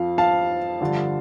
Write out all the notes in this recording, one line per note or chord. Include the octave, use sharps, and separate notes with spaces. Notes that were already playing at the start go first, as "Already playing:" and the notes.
Already playing: F2 F3 F5
F5 A5
G2 D3 F3